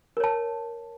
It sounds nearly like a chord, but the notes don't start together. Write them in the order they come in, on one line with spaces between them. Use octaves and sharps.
A#4 C#5 A5